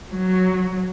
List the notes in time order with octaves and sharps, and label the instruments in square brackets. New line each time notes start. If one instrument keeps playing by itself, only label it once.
[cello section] F#3